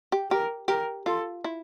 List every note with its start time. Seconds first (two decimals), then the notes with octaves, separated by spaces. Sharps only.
0.12 G4
0.31 G4 A#4
0.68 G4 A#4
1.06 F4 A4
1.44 E4